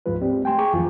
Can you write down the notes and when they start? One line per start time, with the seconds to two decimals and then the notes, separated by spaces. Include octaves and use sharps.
0.06 D2 G#2 F3 G#3 F4 B4
0.21 G#3 C4 G4 D5
0.44 A3 G5 G#5 C6
0.58 G#4 G5 G#5 A#5 C#6 D6
0.74 F2 D3 E3 F3 F4